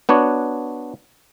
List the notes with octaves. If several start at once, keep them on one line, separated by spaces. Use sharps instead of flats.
B3 D4 F#4 C#5